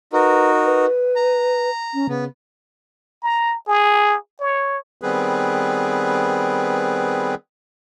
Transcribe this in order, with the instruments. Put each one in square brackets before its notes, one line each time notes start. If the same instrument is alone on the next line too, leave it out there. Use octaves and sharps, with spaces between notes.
[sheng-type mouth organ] D#4 F#4 A#4 [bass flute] B4
[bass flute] B4
[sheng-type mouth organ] A#5
[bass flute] C#4
[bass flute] C#3 [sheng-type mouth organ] B3
[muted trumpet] A#5
G#4
C#5
[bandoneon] D#3 G3 B3 C4 G#4 B4